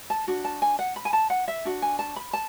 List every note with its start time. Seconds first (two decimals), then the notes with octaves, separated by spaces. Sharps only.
0.10 A5
0.28 D4 F#4
0.44 A5
0.62 G#5
0.79 F#5
0.96 B5
1.05 G#5
1.13 A5
1.30 F#5
1.48 E5
1.65 D4 F#4
1.82 G#5
1.99 A5
2.16 B5
2.33 A5